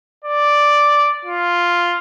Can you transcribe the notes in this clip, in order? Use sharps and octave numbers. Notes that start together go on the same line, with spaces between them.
D5
F4